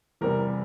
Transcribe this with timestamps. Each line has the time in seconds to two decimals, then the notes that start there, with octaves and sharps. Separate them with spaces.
0.21 E2 C3 G3 A#4